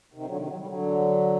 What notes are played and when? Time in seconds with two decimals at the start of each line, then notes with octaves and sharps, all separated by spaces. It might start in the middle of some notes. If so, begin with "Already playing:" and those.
0.14 C3 D#3
0.25 D3 F#3
0.36 C3 D#3
0.47 F#3
0.57 G3
0.68 D3 F#3